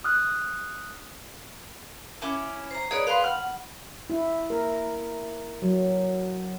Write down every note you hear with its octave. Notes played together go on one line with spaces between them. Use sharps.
D#6 F6 F#6
C#4 E4 D6
C5 A#5
D#4 G#4 B4 C#5 D5
B4 F5 G5 C6
F#5 F6
E4
A#4
F#3